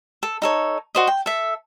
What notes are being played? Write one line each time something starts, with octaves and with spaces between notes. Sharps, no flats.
A4
D#4 A4 C#5
F#4 C5 D#5
G5
A4 E5